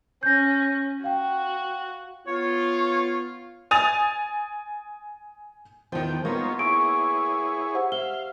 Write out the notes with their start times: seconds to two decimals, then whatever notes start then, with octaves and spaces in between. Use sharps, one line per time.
0.23 C#4 G6 A#6
1.04 F#4 F5 G5
2.27 B3 F4 C#5
3.71 G#5 D#6 A6 F7
5.92 E2 D#3 F3 G5
6.25 A#3 B3 D#4 F4 C#5
6.59 E4 G#4 C#5 C#6 D7
7.74 G4 C5 F#5
7.92 E5 F5 G7